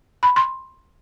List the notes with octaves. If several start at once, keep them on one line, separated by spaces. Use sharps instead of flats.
B5
C6